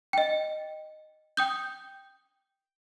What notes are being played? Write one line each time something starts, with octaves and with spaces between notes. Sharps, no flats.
D#5 G5
G5 D#6 G6